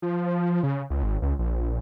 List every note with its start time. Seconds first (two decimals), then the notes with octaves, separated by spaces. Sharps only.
0.02 F3
0.63 C#3
0.90 C#2
1.03 G#1
1.22 C#2
1.39 A#1